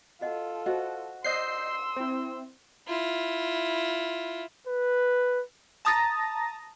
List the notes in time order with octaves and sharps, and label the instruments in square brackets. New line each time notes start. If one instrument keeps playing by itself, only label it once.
[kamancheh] F4 A4 [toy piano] F#4 D#5 F#5
[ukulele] F#4 [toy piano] C5 D#5
[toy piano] C5 D5 [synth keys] D#5 G6 C7 [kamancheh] C6 E6
[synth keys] C4 E4
[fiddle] E4 F4
[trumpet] B4
[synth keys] A5 A#5 D#6 A6 A#6